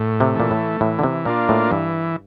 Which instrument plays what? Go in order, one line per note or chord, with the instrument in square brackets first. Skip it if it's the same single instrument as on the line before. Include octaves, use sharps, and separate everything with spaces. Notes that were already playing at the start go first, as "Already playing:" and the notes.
Already playing: [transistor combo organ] A2
[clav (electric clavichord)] C3
[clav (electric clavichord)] A#2 [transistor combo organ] E3 A3
[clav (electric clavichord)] A2
[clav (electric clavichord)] A2 [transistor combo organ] E3
[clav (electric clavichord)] D3
C3
[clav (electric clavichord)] A#2 [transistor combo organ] A#3 D4 F4
[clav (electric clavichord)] A2
[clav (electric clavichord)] G2 [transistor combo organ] E3